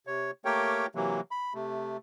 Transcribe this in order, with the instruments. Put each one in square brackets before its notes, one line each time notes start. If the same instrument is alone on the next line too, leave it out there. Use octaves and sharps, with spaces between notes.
[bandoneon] C3 C#5
A3 A#3 G4 A#4 C#5 G5
C3 E3 F#3 A#3
B5
C3 A3